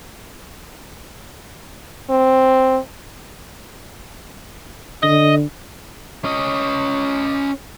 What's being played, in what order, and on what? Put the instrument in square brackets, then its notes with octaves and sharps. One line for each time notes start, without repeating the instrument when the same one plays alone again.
[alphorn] C4
[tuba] D3 [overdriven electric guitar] D#5
[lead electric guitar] C#4 D#5